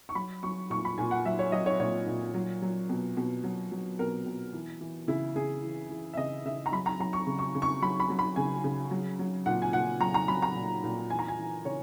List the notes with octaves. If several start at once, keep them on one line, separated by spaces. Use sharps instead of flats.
C#6
F#3 B5
F#3 C#6
A#2 C#6
B5
A#2 G#5
F#5
F#3 E5
C#5
F#3 D#5
C#5
A#2 C#5
A#2
F#3
F#3
B2
B2
F#3
F#3
B2 A#4
B2
E3
E3
C#3 E4
C#3 G#4
E3
E3
E5
C#3 D#5
C#3 E5
A#5
F#3 B5
A#5
F#3 A#5
C#6
C#3
C#6
C#3
C#6
F#3 B5
B5
F#3
B5
C#3 G#5
C#3
F#3
F#3
A#2 F#5
G#5
A#2 F#5
F#3 A#5
A#5
F#3 B5
A#5
A#2
A#2
E3 G#5
A#5
G#5
E3
C#3 C#5